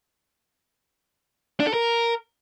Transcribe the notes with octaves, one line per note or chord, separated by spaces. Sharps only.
D4
A4
A#4